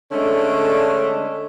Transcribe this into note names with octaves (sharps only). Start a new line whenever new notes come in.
D3 G#3 A3 C#4 D4